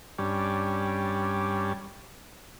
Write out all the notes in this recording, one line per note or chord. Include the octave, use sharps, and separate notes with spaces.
G2 G3 C#4 D4